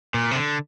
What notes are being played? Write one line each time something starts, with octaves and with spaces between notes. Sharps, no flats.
A#2
C3
D3